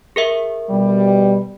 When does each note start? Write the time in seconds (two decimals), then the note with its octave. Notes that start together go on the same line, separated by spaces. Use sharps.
0.16 G#4 A#4 E5
0.70 B2 G3